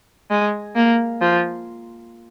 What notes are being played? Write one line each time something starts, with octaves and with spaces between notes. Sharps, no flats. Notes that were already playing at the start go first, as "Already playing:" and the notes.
G#3
A#3
F3